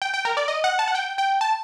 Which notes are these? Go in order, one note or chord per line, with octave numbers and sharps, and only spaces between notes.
G5
G5
A#4
D5
D#5
F#5
A5
F#5
G5
G5
A5